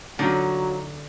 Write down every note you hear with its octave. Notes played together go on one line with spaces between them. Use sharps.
D3 F#3 D#4 F4